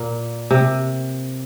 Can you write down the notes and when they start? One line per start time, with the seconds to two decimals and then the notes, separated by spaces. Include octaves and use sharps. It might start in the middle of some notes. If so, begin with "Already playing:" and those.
Already playing: A#2 A#3
0.51 C3